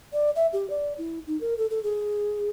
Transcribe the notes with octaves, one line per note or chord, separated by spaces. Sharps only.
D5
E5
G4
D5
E4
D#4
A#4
A4
A4
G#4